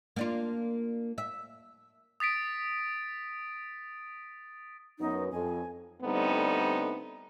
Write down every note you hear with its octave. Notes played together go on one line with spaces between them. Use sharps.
A#3 D4 F4
E5
D#6 A6 B6 D7
F#2 F#3 B3 D#4
F2 G#5
D3 G3 A3 B3 C4 D#4